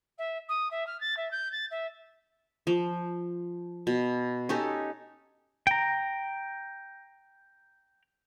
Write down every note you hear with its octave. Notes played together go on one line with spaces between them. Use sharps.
E5
D#6
E5
F6
A6
E5
G6
A6
E5
F3
B2
C#4 D#4 G4 A4
G5 A#5